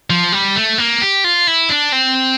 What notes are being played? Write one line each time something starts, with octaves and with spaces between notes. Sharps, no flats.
F3
G3
A3
A#3
G4
F4
E4
D4
C4